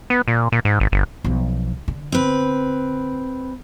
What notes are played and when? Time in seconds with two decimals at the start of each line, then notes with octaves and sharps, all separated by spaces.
0.10 B3
0.28 A#2
0.52 A#2
0.65 G#2
0.80 G#1
0.92 G1
1.24 B1 F3
1.88 D3
2.12 C4 B4